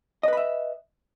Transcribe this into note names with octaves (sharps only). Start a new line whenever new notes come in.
B4 D#5 E5 B5